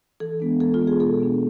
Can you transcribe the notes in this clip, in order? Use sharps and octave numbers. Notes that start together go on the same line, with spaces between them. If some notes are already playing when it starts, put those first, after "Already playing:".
E3 A4
G#3 B3 D4
E3 A4
F4
G#3 B3 D4
G#4
B2 A4
B3 D4